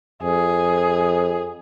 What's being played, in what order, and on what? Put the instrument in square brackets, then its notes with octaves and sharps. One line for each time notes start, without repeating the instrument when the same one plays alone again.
[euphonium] F2 [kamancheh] G#4